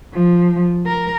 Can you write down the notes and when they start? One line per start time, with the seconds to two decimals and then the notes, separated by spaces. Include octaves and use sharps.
0.13 F3
0.86 A#4